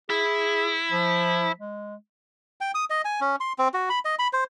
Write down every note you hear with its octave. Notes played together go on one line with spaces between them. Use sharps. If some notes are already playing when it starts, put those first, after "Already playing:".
E4 G#4
F3
G#3
G5
D#6
D#5
G#5
C#4
C6
C4
F#4
B5
D#5
B5
C5